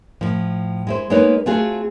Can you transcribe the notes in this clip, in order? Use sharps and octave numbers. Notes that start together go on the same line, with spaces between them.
A2 F3
G#3 E4 C5
G#3 A#3 B3 D#4 B4 C#5
A3 C4 F4 F#4 G#4